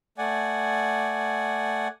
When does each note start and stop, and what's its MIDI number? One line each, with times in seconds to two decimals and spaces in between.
0.18 1.88 57
0.18 1.88 74
0.18 1.88 78
0.18 1.88 80